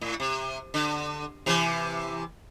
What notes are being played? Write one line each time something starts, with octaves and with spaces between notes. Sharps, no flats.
A2
C3
D3
C3 E3